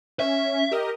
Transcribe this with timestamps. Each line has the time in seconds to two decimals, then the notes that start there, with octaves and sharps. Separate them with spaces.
0.20 C#4 E5
0.71 G4 A#4 D#5